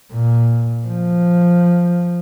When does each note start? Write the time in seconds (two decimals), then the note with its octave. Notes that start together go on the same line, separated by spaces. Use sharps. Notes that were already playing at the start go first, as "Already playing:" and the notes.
0.13 A#2
0.87 F3